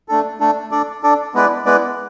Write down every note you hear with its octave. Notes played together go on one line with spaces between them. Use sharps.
A3 D4 A4
A3 D4 A4
D4 A4 D5
D4 A4 D5
G#3 B3 E4 B4 D5
G#3 B3 E4 B4 D5